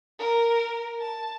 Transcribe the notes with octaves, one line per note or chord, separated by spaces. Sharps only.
A#4
A5